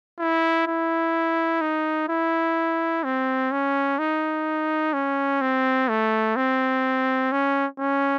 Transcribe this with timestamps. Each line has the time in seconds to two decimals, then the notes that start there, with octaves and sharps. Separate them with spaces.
0.19 E4
0.67 E4
1.61 D#4
2.09 E4
3.04 C4
3.51 C#4
3.99 D#4
4.93 C#4
5.41 C4
5.89 A3
6.36 C4
7.32 C#4
7.79 C#4